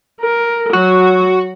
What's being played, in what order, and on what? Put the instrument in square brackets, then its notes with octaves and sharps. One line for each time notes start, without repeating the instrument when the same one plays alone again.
[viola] A#4
[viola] F#3 [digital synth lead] F#4